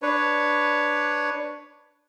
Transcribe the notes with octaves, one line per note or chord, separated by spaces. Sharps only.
D4 B4 C#5